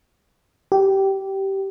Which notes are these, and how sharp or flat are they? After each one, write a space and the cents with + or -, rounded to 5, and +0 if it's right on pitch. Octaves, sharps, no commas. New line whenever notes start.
G4 -15